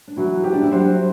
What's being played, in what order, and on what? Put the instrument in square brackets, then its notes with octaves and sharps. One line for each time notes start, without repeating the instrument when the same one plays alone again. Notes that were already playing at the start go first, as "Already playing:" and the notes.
[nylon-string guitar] D4
[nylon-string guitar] E3 E4 [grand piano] F#3
[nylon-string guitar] C4 [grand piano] G4
[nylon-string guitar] D4
E4
[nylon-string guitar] F#3 F#4 [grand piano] C5